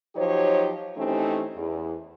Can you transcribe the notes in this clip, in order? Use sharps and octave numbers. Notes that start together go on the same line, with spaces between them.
F3 F#3 D#4 G4 C5 C#5
E3 A3 C4 C#4 D#4 G4
E2